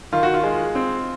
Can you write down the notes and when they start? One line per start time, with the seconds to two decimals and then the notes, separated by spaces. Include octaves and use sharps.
0.12 D#3 F4
0.23 F#4
0.34 F4
0.43 G#3
0.75 C4